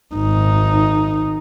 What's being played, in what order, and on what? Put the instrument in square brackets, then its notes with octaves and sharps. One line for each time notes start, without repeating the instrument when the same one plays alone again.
[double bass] G#1 D#4